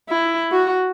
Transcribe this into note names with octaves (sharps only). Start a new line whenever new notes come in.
E4
F#4